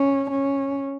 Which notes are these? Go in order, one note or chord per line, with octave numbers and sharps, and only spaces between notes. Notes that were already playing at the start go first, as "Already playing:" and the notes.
Already playing: C#4
C#4